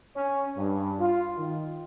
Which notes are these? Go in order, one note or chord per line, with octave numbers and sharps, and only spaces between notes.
C#4
G2
F4
D#3